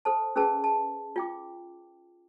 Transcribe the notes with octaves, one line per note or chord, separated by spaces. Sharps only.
A4 C5 A5
C#4 G#4 A#4 B4 A5
A5
F4 G5 D6